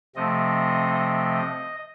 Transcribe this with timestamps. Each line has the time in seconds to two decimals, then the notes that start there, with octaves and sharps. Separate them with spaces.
0.16 C3 F3 A3 C4 D#5
0.94 D#5